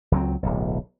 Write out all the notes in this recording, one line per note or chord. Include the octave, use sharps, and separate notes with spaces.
C#2 F#3 C4
D1 B1